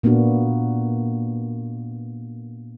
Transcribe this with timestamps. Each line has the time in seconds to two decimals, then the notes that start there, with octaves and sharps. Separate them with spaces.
0.03 A#2 A#3 B3 D4 F#4